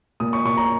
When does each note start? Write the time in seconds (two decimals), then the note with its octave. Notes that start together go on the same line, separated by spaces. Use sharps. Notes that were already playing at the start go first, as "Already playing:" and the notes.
0.20 A#2 D#6
0.33 C#6
0.45 A#2 C#6
0.57 A#5